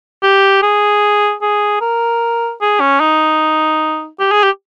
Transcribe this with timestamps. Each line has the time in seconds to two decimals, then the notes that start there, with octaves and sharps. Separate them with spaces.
0.23 G4
0.63 G#4
1.42 G#4
1.81 A#4
2.61 G#4
2.80 C#4
3.00 D#4
4.19 G4
4.31 G#4
4.43 G4